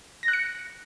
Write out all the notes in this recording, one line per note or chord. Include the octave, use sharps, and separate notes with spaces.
A#6
F#6
C#7